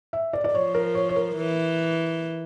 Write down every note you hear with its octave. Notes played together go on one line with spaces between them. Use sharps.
E5
D5
D5
F3 C#5
A#4
C#5
C#5
A#4
E3